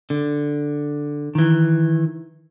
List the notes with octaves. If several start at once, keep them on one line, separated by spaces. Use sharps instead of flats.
D3
D#3 E3